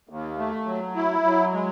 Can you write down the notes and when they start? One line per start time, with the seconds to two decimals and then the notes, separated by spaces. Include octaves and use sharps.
0.09 D#2
0.38 A3
0.66 F#3
0.96 E4
1.24 F#3
1.53 G#3